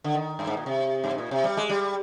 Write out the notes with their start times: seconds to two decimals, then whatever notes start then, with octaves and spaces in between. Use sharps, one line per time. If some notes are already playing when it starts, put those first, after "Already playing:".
0.04 D3
0.15 D#3
0.39 G2
0.47 G#2
0.57 A#2
0.66 C3
1.04 G2
1.11 G#2
1.18 A#2
1.31 C3
1.44 G3
1.57 G#3
1.69 G3